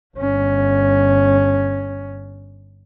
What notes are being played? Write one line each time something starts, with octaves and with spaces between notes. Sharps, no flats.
G1 C#4